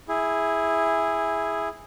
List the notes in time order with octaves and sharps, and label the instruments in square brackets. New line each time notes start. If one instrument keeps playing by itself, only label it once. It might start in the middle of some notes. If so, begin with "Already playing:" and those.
[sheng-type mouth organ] E4 G#4